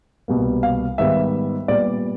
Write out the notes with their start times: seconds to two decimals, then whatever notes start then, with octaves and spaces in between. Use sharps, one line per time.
0.28 C2 B2 G3 A#3
0.63 F5
0.98 G#2 D#3 G3 B3 E5
1.68 A#2 G3 B3 D5